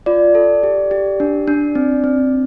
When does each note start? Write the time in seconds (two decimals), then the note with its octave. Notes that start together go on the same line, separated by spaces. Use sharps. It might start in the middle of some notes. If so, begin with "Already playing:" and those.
0.06 F4 D5
0.35 A4
0.63 G4
0.91 G4
1.20 D4
1.48 D4
1.75 C4
2.04 C4